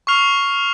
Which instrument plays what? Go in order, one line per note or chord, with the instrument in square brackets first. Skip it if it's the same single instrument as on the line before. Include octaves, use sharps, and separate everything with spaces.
[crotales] C#6 F6 C7 F7